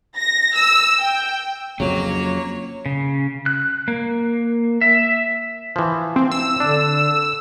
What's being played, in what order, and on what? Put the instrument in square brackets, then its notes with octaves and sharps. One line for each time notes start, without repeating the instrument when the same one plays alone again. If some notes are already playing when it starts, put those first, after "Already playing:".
[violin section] A#6
E6
G5
[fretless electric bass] F2 C#3 [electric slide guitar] F#3 [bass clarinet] A#3 [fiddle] C#5
[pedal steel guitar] C#3
F#6
A#3
E5
[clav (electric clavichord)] E3 F3
[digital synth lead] C4
E6
[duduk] D3 [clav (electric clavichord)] D4